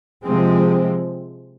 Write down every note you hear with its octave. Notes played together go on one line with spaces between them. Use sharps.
C3 F3 G#3 C4